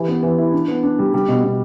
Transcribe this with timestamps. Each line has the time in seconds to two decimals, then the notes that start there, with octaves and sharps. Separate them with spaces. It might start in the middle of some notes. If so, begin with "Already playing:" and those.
Already playing: E3 G4
0.08 B3
0.23 E3
0.38 E4
0.52 D4
0.68 B3
0.83 D4
0.99 G3
1.14 G3
1.28 B2
1.44 B2